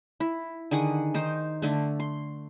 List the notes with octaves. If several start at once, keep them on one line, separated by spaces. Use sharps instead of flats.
E4
D3 D#3 G#4 F#5
D#3 D#4 C5
D3 A3
C6